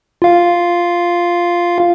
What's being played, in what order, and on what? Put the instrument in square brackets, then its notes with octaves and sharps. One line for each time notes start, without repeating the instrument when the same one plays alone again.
[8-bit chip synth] F4 F5